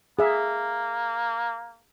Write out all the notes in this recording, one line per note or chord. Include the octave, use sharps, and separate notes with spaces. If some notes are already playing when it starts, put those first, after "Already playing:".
A#3 G#4 E5